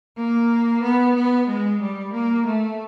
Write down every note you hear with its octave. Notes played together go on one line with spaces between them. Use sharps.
A#3
B3
B3
G#3
G3
A#3
A3